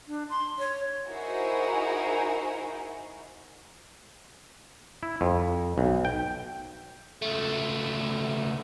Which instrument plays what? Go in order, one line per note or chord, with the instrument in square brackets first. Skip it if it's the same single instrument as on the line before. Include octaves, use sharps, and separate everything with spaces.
[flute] D4
C6
C#5
[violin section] D#4 E4 F#4 G#4 A#4 C5
[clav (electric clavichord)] E4
F2
B1
G5
[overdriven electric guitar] C#2 A3